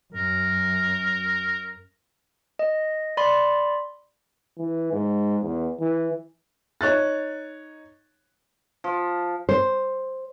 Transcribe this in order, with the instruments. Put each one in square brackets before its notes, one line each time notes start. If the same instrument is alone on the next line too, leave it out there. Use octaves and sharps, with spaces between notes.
[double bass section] F#2 [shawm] A#4
[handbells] D#5
D5 B5 C6
[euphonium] E3
G#2
E2
E3
[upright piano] D#4 C#5 F#6 A6
[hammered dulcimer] F3
[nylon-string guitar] C5